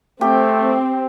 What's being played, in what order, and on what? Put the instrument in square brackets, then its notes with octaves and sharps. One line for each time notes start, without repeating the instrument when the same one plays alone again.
[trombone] A3 [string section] C4 [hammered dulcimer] G4